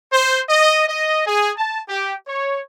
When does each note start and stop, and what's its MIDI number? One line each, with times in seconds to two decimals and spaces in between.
0.13 0.41 72
0.49 0.86 75
0.88 1.24 75
1.27 1.51 68
1.57 1.80 81
1.89 2.13 67
2.28 2.62 73